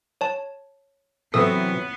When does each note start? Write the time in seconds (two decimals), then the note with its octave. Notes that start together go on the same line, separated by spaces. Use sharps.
0.21 C#5 A5
1.34 C3 E3 F#3 B3 A4 D#6